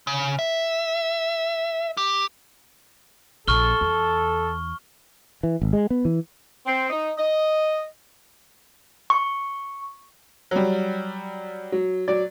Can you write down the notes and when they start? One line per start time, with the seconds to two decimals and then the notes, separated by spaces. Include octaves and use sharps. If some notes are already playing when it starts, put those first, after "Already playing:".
0.07 C#3
0.39 E5
1.97 G4
3.48 A#1 A4 C#6 F6 G7
3.81 E2
5.43 E3
5.62 G#1
5.73 G#3
5.90 B3
6.05 E3
6.66 C4
6.90 D#4
7.18 D#5
9.10 C#6
10.51 F#3 G3
11.72 F#3
12.08 F#3 D5